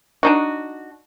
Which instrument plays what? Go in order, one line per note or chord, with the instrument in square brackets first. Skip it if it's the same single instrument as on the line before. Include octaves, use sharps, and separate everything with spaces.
[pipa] D4 D#4 F#4